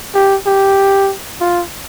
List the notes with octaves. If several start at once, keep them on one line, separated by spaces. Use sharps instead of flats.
G4
G4
F4